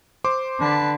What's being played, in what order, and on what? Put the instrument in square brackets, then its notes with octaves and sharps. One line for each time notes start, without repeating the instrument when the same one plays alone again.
[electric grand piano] C5 C6 D6
[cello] D3 [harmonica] B4 A5